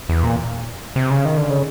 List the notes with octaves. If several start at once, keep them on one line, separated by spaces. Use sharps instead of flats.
E2
A#2
C3
C#3
D#3
D3
C#3